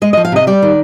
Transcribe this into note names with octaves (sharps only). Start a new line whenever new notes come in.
G#3 D#5
D#5
F3
F5
C3 D#5
G3 D5
D#3